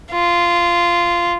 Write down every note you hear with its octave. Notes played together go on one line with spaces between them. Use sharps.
F4